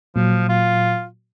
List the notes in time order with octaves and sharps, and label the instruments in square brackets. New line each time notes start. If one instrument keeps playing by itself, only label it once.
[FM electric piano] A#2 F#3 [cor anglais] F3
[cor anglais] F4